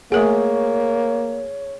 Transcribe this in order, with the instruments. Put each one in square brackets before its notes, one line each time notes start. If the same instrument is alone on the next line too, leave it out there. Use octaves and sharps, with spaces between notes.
[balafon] A3 A#4 F#5 [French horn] A#3 [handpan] G#4 [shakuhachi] C#5